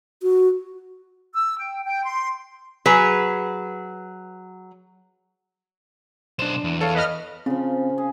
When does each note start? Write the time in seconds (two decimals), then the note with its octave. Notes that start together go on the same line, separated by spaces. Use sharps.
0.23 F#4
1.34 E6
1.57 G5
1.84 G5
2.05 C6
2.86 F#3 G#4 B4
6.39 B1 D4 C5 E7
6.64 E2
6.81 A4 C#5 F5
6.94 B4 D#5 F6
7.46 C#3 F3 C4
7.98 G#4